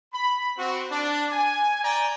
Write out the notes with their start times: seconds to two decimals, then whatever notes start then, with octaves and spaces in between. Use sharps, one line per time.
0.12 B5
0.57 C4 F#4
0.91 D4
1.32 G#5
1.83 D5 G5 G#5 A#5